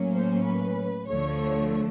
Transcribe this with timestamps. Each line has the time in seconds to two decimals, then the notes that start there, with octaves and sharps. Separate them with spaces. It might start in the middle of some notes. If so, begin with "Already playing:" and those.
Already playing: A2 F#3 A#3 C#4
0.12 C5
0.44 B4
1.07 D2 D3 F3 A3 C#5